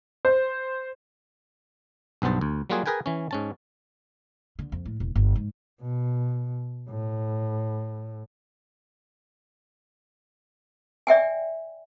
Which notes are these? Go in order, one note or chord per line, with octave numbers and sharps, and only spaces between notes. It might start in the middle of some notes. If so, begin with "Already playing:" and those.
C5
B1 G2 B3 C5 A5
D2
F#3 G3 A#3 F4 F#4 G#4
G#4 A#4 B4 G5 G#5
E3 C#4
G#2 C#4 A5
D3
F2
A2
E1
G1
G#2
B2
A2
D5 E5 G5 G#5